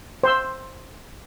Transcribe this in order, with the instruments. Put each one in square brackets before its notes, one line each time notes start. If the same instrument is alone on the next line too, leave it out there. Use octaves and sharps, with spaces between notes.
[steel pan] C5 C6 E6